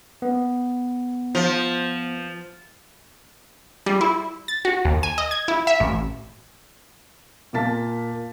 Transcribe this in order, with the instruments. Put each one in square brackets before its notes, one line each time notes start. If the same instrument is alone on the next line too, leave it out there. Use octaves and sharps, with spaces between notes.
[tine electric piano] B3
[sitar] F3
[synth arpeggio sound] G3
E4
A6
F#4
D#2
G#5
D#5
G#6
E4
E5
A1
[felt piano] A#2 A#3 F4 A5 A6 B6